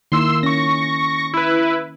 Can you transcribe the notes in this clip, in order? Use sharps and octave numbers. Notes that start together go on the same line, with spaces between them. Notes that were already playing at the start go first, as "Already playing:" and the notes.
D#3 A#3 E4 C6 E6
C#4 C#6 A#6
E4 B4